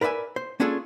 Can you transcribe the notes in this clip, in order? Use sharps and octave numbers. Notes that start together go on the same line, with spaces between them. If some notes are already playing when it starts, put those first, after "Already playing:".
A#4 B4 D5 E5 G#5
C5
A#3 C#4 D4 F4 G#4 A4